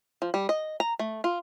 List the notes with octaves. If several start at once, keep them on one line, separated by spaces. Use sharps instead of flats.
F3
G3
D#5
A#5
A3
F4